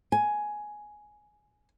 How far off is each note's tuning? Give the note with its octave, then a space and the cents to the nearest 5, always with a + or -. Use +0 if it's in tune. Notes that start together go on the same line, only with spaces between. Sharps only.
G#5 +10